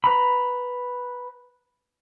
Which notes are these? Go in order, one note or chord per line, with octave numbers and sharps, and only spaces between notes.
B4 A#5 B5